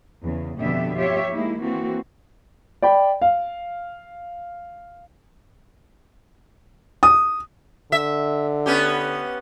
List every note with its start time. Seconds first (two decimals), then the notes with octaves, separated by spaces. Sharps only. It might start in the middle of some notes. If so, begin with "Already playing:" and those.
0.22 E2 C#3
0.58 F2 B2 D3 B3 G4 E5
0.98 F4 G4 C#5 E5
1.31 G#3 A#3 D#4 E4
1.61 E3 A#3 C4 F#4
2.82 D5 G5 B5
3.22 F5
7.03 D#6
7.92 D3 E5
8.66 B3 C#4 G4